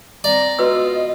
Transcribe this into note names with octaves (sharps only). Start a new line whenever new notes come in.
C4 D5 A#5
B3 F4 F#4 B4 D#5 E6